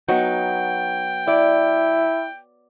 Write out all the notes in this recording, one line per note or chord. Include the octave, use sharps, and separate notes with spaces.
F#3 B3 D#4 G5
E4 D5